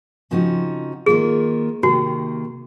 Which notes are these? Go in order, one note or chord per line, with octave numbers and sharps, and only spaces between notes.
C#3 F3 C4 D#4 F#4
D#3 A#3 F4 G#4
C3 D#3 A#3 F#4